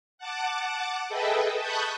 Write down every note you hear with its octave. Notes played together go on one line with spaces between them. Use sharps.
F#5 A5 D6
G#4 A4 B4 D#5 E5 G5
A5 B5 C#6 D#6 F#6 G6